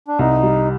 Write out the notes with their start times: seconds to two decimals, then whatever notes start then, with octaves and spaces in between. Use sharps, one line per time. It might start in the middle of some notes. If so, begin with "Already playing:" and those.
0.08 D4
0.19 C2 D#4
0.43 G3